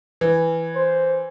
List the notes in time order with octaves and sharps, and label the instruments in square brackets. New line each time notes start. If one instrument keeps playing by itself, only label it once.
[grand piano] E3
[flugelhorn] C5